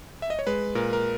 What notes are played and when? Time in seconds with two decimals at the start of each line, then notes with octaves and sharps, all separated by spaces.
0.22 E5
0.30 D#5
0.39 C#5
0.47 G#3 B4
0.75 A#2 A#4
0.93 A#4